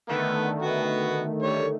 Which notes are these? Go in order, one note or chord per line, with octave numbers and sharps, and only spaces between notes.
D3 D#3 A3 B3
B3 F#4
G3 C#5